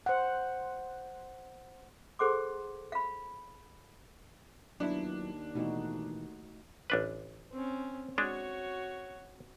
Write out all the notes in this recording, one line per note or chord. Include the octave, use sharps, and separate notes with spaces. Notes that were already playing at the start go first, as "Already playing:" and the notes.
C5 F#5
G#4 A4 C5 F#5 C6 D6
F5 B5
D#2 F#3 B3 D4 E4
B2 E3 A3 D#4 F#4
A1 D4 B4
C4 C#4
G#3 D4 F#4 C#5